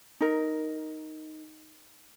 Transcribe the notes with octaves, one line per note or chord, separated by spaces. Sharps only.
D#4 A#4